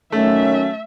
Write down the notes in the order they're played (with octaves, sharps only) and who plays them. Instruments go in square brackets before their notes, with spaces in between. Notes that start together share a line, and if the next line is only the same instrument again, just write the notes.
[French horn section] D#3 F#3 C#4 [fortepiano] A3 [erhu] E5